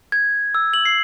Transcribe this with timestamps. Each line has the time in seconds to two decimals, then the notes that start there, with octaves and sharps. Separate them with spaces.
0.12 G#6
0.55 E6
0.73 F#7
0.85 C7